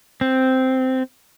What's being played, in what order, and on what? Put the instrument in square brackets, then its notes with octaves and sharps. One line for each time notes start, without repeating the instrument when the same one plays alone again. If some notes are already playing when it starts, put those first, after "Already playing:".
[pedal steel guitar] C4